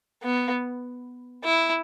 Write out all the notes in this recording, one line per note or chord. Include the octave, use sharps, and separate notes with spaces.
B3
E4